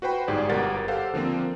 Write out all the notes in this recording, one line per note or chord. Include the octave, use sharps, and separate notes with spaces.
F#4 B4 C5 G5 B5
G1 G#2 G4 G#4 D5
G1 B2 G4 A#4 F#5 A6
G4 A4 C5 F5 F#5
D3 F3 A#3 C4